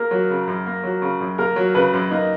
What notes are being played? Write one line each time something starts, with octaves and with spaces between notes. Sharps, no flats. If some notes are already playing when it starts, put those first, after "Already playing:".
Already playing: A#3 A#4
F#3
C#3
F#2
A#3
F#3
C#3
F#2
A#3 A#4
F#3
C#3 B4
F#2
A#3 D#4